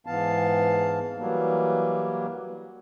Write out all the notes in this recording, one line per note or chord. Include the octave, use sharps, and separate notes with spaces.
G#2 E3 B3 F5 A5
E3 F#3 G3 A#3